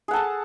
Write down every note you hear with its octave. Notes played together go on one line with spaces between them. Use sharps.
G#4 A4 F#5 A5